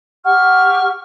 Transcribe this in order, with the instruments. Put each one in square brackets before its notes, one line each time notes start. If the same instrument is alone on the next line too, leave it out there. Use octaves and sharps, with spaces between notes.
[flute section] G4 C#6 F6 [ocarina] F#5